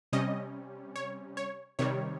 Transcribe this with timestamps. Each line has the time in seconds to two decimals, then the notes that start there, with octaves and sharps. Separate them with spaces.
0.13 C3 G3 C#4 D#5
0.96 C#5
1.37 C#5
1.79 C3 D#3 G3 C#5